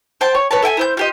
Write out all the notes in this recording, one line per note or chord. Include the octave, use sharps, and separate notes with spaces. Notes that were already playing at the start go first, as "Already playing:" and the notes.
C5 G5 A5
C#5
B4 C#5 A5
A4 E5 G5 G#5
E4 C5 G6
F4 G4 D#5